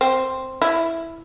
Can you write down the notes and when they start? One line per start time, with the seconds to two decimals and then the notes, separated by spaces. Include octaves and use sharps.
0.01 C4
0.62 E4